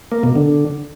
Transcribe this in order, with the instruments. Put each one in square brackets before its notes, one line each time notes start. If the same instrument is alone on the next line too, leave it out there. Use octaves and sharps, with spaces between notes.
[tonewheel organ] A#3
B2
D3